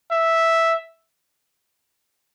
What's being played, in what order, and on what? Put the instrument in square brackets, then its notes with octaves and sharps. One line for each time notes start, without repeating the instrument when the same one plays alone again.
[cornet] E5